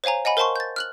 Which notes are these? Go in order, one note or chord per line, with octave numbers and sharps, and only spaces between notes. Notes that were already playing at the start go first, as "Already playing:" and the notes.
C5 C#5 F5 G#5 A#5
D#5 F#5 G#5 B5
A#4 C5 F5 A5 C6 C#6
G6 A6
F6 F#6 F#7